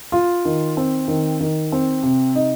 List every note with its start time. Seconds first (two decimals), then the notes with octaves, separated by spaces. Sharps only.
0.12 F4
0.45 D#3
0.77 C4
1.08 D#3
1.41 D#3
1.72 C4
2.03 C3
2.35 D#4